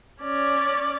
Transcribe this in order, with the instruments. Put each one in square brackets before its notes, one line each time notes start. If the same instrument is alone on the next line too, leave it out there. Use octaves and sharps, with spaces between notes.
[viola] C#4 D5